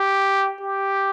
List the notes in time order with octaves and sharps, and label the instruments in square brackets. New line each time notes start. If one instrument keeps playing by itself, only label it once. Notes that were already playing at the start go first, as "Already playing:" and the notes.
Already playing: [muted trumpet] G4
G4